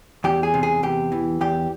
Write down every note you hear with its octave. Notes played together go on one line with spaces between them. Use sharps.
E2 G4
G#4
C3
G#4
E2 G4
E3
E2 G4